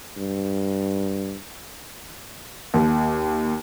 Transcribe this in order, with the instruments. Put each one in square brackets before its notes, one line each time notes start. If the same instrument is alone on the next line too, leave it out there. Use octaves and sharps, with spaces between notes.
[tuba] G2
[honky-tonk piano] D#2